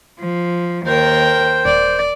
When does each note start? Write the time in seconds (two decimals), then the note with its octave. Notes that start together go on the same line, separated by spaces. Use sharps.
0.19 F3
0.86 D#2 A#4 C5 G5
1.65 D#1 D5